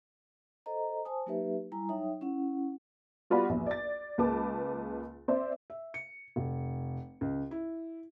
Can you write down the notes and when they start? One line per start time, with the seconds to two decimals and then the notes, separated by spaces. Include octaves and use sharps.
0.66 A4 C5 D#5 A#5
1.05 C5 G#5 A5 D#6
1.26 F#3 A#3 D#4 G4 B4 E5
1.72 G3 E4 G#5 A#5
1.89 F#3 D#4 C#5 E5 G5 D#6
2.21 C#4 E4 F#5
3.30 G3 B3 F4 F#4 D5 B5
3.49 A#1 E2
3.67 D5 A6
4.18 C#2 G#3 A#3 B4 A5 D6
5.28 C4 C5 D5 E5
5.70 E5
5.94 C#7
6.36 F1
7.21 C#2
7.51 E4